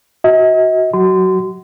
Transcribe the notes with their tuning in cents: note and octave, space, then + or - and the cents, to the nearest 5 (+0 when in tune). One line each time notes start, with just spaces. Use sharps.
F#4 +0 D#5 +40
F#3 +0 F#4 +20 C6 -25